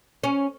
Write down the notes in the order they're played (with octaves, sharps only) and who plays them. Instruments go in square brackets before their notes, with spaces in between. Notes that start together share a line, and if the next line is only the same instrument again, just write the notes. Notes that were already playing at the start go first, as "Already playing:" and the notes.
[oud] C#4